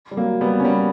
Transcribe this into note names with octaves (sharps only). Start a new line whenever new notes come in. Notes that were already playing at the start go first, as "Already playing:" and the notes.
G3
F#3 A#3
G3 B3
C#4
G3 B3